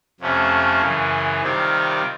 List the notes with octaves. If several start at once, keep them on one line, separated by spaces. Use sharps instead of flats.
F2 C3 F3 A3 C#4
F#2 C#3 E3
C3 D#3 G3 C4 F4